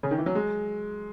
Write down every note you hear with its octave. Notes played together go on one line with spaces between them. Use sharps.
C#3
D#3
E3
F#3
G#3